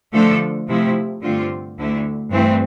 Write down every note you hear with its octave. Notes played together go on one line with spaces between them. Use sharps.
D3 F3 A3 D4 A4
C3 F3 A3 E4
G2 D3 A3 C4 F4
D2 D3 A3 E4
G2 E3 A3 C4